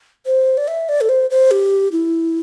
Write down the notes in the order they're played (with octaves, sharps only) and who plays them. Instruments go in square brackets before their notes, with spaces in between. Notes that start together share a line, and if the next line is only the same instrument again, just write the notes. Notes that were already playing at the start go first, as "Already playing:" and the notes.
[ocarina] C5
D5
E5
D5
A4
C5
C5
G4
E4